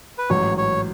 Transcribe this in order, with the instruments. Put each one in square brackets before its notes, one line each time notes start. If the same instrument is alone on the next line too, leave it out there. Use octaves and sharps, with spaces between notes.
[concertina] B4
[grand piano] A1 G#2 F#3 [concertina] C#5
[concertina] C#5